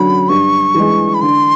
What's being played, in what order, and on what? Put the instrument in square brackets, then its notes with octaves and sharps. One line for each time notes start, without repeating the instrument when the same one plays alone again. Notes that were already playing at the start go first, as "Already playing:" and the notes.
Already playing: [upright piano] F#2 D3 F#3 [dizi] B5
[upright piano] G2 [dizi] C#6
[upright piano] E3 G#3
[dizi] B5
[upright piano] D3 [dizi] C6